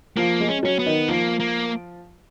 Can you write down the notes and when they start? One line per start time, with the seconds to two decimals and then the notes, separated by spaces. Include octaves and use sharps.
0.17 F3 A#3 F4
0.40 G#3
0.48 C#4
0.63 F#3 C#4
0.79 B3
0.86 D#3 D#4
1.08 F3 A#3 F4
1.40 A#3